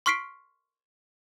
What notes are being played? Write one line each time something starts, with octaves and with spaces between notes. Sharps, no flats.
C6 C#6 F6 B6 C7 D7